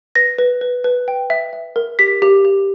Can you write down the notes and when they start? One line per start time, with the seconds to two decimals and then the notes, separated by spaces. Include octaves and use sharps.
0.15 B4 A#6
0.38 B4
0.61 B4
0.84 B4
1.08 G5
1.30 E5
1.53 E5
1.76 A#4
1.99 G4 B6
2.22 G4
2.45 G4